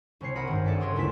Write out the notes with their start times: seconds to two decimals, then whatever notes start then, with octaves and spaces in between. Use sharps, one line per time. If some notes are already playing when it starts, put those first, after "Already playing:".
0.21 C2 C3 C#5 C7
0.36 A#4 E5 F#5 B5 D#6
0.47 G#1 G2
0.65 G#4 A4 D5 E5 F#5
0.80 F#1 A#4 B4 C#5 C6 D#6
0.96 D2 G#3 E4 F4 B6 E7